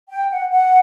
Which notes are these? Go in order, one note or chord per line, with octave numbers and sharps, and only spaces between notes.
G5
F#5
F#5